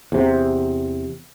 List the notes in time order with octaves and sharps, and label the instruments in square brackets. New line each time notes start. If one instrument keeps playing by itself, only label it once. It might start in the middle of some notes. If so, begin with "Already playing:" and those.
[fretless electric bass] E2 C3